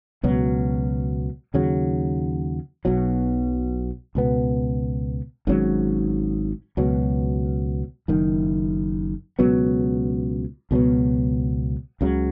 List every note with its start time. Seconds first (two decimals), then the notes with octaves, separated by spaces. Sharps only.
0.23 C#2 B2 F#3
1.54 D#2 C#3 F#3
2.85 B1 B2 F#3
4.15 C#2 B2 B3
5.47 G#1 G#2 F#3 C#4
6.77 C#2 B2 F#3
8.08 F#1 F#2 D#3
9.39 C#2 B2 F#3 B3
10.71 C#2 B2 F#3 B3
12.01 C#2 C#3 F#3